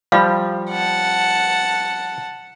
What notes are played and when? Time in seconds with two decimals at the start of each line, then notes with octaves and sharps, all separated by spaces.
0.12 F3 G3 F5 B5
0.70 F#5 A5